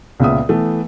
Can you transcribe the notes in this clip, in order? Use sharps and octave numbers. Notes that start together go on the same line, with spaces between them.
C#2 A#2 C#3 B3 E5 D#6
E3 A3 B3